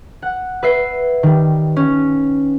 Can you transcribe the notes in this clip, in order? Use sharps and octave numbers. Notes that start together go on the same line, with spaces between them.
F#5
B4 E5 C7
D#3 G3
C#4